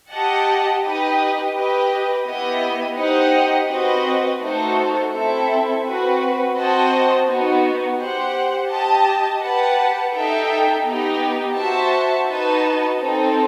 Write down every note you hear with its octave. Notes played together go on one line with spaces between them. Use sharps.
G4 D#5 F#5 A5
D#4 G4 B4 D#5
G4 B4 D#5
B3 E4 G4 D#5
D#4 G4 C5 D#5 F#5
C4 F#4 B4 D#5
A3 D#4 F#4 A4 C5
C4 E4 A4 E5
C4 F#4 B4
C4 F#4 C5 D#5 A5
B3 D#4 F#4
G4 C5 F#5
G4 D#5 A5
G4 B4 F#5 A5
D#4 A4 E5 G5
B3 D#4 G4
F#4 C5 E5 A5
D#4 F#4 B4 D#5 A5
C4 D#4 A4